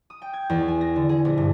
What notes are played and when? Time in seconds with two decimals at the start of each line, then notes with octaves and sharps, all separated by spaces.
0.10 D#6
0.22 G5
0.33 G#6
0.50 E2
0.68 G#5
0.81 A#6
0.96 D3
1.09 G#4
1.25 A#1
1.38 G2